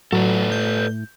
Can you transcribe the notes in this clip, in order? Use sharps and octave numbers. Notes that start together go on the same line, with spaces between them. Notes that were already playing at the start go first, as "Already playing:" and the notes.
A2 F#3 A4 B4 D5
G6